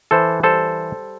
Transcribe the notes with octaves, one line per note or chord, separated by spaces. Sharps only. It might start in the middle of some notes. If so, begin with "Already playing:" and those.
E3 A4 C5
G3 A4 C5